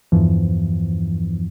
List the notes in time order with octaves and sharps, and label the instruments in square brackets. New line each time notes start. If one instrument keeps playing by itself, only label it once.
[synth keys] E2 G2 E3 F3